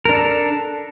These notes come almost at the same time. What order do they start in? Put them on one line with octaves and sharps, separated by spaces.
A#4 D4 A4